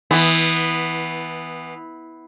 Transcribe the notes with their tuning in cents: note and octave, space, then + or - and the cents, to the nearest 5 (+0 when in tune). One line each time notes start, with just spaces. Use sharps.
E3 -20 B3 +0